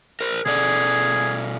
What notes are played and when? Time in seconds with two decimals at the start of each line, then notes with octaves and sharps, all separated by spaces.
0.21 A#4 C5
0.46 B2 G#4 A4 D5